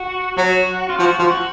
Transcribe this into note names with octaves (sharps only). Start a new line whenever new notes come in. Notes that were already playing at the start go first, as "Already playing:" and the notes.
Already playing: F#4
F#3 F#4
F4
F3 F#4
F3
F#4